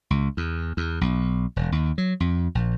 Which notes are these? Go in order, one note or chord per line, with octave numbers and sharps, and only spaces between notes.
C#2
E2
E2
B1
E1
D#2
F#3
F2
A#1